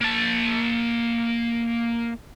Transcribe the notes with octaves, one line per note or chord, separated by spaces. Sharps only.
A#3 A5